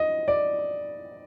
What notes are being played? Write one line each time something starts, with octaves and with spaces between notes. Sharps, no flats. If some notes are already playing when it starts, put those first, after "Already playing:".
Already playing: D#5
D5